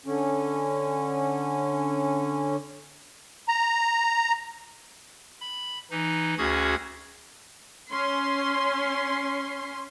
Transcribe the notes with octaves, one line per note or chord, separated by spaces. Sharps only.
D3 C#4
A#5
B5
E3 D#4
D2 C#4 F#4 G#4 D#6 G#6
C#4 C6